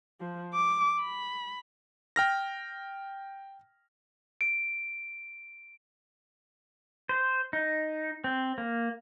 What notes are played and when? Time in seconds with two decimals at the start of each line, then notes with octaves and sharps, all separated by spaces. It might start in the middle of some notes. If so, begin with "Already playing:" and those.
0.20 F3
0.54 D6
1.01 B5
2.16 G5 F6 A#6
4.41 D7
7.09 C5
7.53 D#4
8.24 C4
8.58 A#3